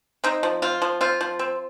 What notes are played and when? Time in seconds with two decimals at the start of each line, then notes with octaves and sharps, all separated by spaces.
0.24 C4 D#4
0.43 F3
0.62 C4 F4
0.82 F3
1.01 C4 F4
1.21 F3
1.39 C4